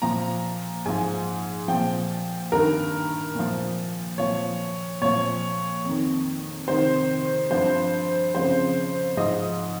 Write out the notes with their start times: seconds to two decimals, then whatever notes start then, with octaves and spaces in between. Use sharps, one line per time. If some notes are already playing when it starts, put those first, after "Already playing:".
0.02 A#2 F3 A#5
0.86 G#2 F3 G#5
1.68 F3 G5
1.73 A#2
2.52 G2 D#3 A#4
3.35 A#2 F3
4.18 A#2 F3 C#5
5.01 A#2 F3 C#5
5.84 F2 D#3
6.68 F2 C3 D#3 C5
7.51 G2 F3 C5
8.34 F2 C#3 F3 C5
9.17 G#2 F3 D#5